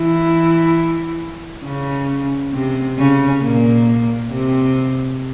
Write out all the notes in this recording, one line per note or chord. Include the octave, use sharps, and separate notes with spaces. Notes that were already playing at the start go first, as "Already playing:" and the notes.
Already playing: E3 E4
C#3 C#4
C3 C4
C#3 C#4
A#2 A#3
C3 C4